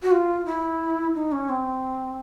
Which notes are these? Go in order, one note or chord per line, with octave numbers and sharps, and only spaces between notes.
F#4
F4
E4
D#4
C#4
C4